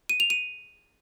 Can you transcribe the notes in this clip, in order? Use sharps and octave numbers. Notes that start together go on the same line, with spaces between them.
D#7
F7
D#7